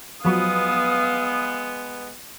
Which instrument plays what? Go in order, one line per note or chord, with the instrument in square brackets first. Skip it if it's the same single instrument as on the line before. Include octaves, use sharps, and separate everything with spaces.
[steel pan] F3 F#3 [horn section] G#3 B3 [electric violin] F5 D#6